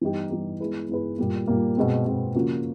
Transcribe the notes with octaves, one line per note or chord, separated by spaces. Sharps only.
E3 G3 B3 D#4 G4
E3 G3 B3 D#4 G4
G#3 B3 E4 G#4 B4
G#3 B3 E4 G#4 B4
A#2 G3 A#3
A#2 G3 A#3
B2 G#3 C4
B2 G#3 C4
C#3 F3 A#3 C#4 F#4